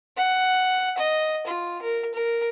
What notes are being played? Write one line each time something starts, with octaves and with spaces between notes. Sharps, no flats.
F#5
D#5
F4
A#4
A#4